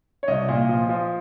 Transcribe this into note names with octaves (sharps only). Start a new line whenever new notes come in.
C#5
C2 D#5
A#2
F3
F3